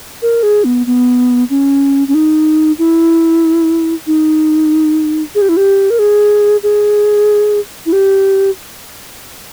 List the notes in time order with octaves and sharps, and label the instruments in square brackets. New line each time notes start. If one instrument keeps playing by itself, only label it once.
[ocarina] A#4
G#4
B3
B3
C#4
C#4
D#4
E4
D#4
G#4
G4
E4
G4
A#4
G#4
G#4
E4
G4